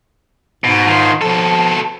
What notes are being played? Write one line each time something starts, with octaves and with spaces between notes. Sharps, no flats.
G#2 B2
D#3 F4
B2 F3 A4